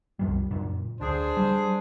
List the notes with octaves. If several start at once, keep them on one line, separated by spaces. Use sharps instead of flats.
C2 F#2 G3
F#2 A#2
D2 D4 G#4 C5
G3